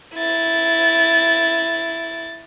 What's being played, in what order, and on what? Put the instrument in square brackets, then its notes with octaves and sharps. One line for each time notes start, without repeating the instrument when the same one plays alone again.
[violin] E4 A6